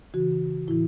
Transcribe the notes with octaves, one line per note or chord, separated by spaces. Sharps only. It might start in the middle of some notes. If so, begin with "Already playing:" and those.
C#3 E3 F#4
A2 E3 E4